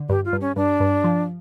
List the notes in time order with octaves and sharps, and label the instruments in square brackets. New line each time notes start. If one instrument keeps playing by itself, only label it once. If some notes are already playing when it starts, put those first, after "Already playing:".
Already playing: [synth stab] D3
[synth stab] G2 [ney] G4
[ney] F4
[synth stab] G2
[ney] C#4
[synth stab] G2 [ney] D4
[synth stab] G2
F3